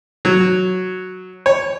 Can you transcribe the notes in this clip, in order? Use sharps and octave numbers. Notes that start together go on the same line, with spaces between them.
F#3
C#5